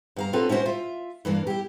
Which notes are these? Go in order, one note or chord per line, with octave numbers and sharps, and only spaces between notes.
G2 F5 A#5
B3 C4 D4 F4 A4 B4
C#4 E4 F#4 C5
F4 E5
G2 E3 A#3 D4
E4 G4